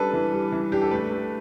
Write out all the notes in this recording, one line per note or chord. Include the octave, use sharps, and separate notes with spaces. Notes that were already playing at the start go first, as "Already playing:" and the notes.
Already playing: G3 D4 A4 B4
E3
G3
E3
D4 G4
A4
A3 B4
A3